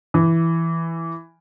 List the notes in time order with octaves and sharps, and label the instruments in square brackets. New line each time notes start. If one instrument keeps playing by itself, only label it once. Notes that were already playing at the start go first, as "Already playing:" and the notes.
[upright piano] E3